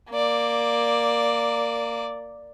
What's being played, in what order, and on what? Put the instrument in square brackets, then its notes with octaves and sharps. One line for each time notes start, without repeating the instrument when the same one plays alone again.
[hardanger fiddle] A#3 D5